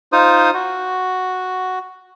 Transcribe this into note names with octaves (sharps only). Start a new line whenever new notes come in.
D#4 F4 C5 D#6
F#4